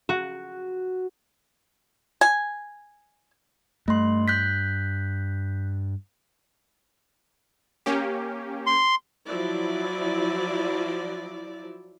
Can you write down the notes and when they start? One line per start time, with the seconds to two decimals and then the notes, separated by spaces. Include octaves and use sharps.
0.09 F#4
2.21 G#5
3.88 G2 A3 C6
4.28 F#6 G6 B6
7.86 A#3 C#4 G4
8.67 C6
9.27 F3 F#3 E4 D5